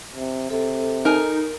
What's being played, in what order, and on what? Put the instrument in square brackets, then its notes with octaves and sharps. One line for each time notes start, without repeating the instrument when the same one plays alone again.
[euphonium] C3
[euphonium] C3 [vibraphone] A4
[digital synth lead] D#4 [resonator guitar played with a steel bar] A#4 G#5